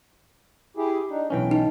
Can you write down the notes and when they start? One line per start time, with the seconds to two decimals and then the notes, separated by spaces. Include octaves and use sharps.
0.77 E4 G4 G#4
1.10 D4 D#4
1.30 B1 E3 C#4 G5
1.51 D#4